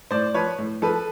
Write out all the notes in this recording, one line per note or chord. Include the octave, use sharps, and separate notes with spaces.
A2 C5 D5
F3 B4 C#5
A2
F3 A4 B4